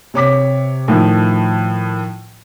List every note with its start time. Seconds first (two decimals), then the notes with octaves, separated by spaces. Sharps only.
0.14 C3 C#5 D6 B6
0.88 A2 D#3 F3 A3